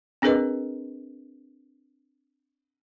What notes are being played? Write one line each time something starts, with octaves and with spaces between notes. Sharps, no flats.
C4 D4 G#4 A#4 B4 D#5